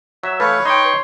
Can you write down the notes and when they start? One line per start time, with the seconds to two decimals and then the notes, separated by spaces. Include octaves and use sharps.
0.23 F#3 E5
0.40 E3 A3 B4 C#5 F5
0.65 D#4 C#5 G5 C6